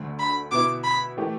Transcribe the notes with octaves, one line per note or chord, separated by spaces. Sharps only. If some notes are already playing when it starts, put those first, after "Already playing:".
Already playing: D2 D3 A3
B5
B2 B3 E4 D6
B5
E3 A3 G4